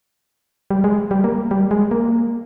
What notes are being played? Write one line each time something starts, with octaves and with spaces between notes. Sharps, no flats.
G3
G#3
G3
A#3
G3
G#3
A#3